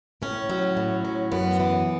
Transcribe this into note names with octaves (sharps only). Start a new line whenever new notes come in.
A2 C#4
F#3
A2
F#3
F#2 B3
E3